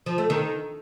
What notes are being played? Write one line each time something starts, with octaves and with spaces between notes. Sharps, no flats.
F3
A3
D#3